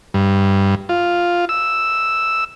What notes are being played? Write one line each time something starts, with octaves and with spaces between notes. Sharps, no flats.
G2
F4
E6